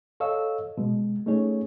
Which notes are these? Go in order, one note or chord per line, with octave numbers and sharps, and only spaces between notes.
A4 C#5 D#5 F5 C#6 E6
B2 G#3
A3 C#4 D#4 G#4 C#5